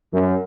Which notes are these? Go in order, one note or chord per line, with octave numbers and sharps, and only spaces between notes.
F#2